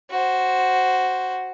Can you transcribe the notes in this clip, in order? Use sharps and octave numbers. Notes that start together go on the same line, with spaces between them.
F#4 C5